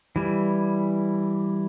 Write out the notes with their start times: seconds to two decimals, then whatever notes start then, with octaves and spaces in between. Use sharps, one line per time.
0.16 E3 G3